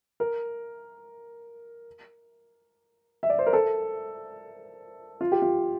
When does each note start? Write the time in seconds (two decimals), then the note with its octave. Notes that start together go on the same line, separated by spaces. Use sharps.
0.20 A#4
3.23 E5
3.30 D5
3.39 C5
3.46 A#4
3.53 A4
5.21 F4
5.32 G4
5.42 F4